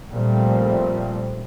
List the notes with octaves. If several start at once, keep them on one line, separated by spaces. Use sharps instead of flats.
A#2 F3 G3 A3 C4